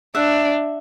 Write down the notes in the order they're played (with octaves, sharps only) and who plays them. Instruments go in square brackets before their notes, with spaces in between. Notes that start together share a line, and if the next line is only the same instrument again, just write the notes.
[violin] D4 [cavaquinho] E5 F#5